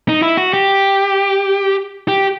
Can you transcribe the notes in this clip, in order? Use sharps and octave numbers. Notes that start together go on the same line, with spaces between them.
D#4
E4
F#4
G4
G4